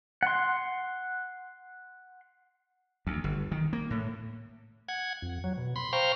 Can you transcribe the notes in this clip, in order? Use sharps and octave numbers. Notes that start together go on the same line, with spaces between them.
F#5 C6
D2
G1
D#3
A#3
A2
F#5 G#6
F2
F#3
B2
B5 C6
C5 F5 G5 A#5 C6 C#6